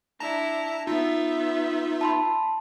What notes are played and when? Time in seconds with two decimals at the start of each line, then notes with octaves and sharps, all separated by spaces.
0.20 D4 E4 A5 A#5 A#6
0.87 B3 D#4 F4 E5
2.01 A5 B5 C6